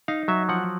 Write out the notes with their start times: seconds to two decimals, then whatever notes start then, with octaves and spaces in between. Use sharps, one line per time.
0.08 D#4 F5
0.28 F#3 E5
0.49 F3 F#5